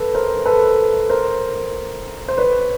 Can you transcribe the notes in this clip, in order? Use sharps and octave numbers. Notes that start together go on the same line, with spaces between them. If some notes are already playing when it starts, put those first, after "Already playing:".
Already playing: A4 B4
A#4 C5
A4 B4
A#4 C5
C5
B4 C#5